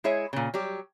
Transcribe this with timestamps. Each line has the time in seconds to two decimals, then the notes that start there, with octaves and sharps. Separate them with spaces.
0.04 G#3 E4 G#4 C#5 E5
0.33 A#2 C#3
0.54 F#3 G3 G4